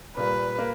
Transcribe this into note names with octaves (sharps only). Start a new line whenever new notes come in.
A#2 G3 A#3 B4
A#3